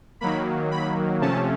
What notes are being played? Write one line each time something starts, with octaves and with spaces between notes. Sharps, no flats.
D#3 F#3 A#3 B5
B5
C3 F3 A3 C#4 A5